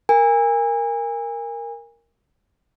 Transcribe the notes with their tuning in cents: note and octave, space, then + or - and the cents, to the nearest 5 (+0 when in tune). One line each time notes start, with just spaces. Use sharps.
A#4 +0 G#5 -30